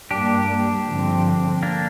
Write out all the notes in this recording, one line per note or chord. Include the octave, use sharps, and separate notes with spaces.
G2 G3 A#3 D4 G4
G2 D3 F3 C4
A#3 D4